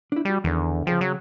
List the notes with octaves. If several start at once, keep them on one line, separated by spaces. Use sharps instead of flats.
D4 E4
G3 F#4 G5
E2 D3 D#3
C#3 F3 G#4 G5
F#3